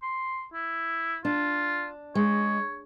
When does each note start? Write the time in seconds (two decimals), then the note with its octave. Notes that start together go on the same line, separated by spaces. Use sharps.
0.02 C6
0.53 E4
1.25 D4 F4
2.15 G#3 C#5